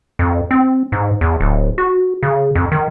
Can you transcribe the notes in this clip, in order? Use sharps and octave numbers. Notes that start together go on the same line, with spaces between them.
F2
C4
G#2
E2
D1
F#4
C#3
F2
D#3